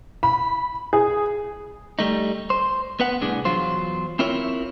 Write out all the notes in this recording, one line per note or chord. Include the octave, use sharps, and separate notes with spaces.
B5
G#4
G3 A3 D#4
C5
B3 B4 F#5
C2 A2 D4 G#4
E2 F#3 F4 C5
C4 E4 F4 A#4 C#5